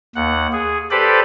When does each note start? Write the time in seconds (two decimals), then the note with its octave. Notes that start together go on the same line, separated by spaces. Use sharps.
0.16 D#2 F#5
0.53 G#4
0.91 G4 A4 B4 C5 D5 B5